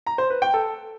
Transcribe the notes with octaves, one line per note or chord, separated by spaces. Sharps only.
A#5
C5
B4
G5
A4